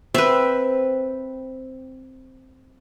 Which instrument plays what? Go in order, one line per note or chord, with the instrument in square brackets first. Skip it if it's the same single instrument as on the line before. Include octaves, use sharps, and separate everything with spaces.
[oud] C4 [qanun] B4 E5